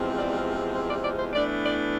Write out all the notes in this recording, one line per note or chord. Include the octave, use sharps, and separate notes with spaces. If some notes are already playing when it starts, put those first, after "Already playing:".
Already playing: E2 C3 F3 G#3 C4
D5
C5
D5
D5
C5
A2 E3 B3 D4 D5
D5